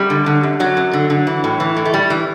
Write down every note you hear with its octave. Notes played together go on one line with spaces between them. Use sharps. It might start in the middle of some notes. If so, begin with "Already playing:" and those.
Already playing: F#2 G3
D3
D3
F#2
D3 F#3
F#2
D3
D3
E3
A2
E3
A2
A3
A2 G3
E3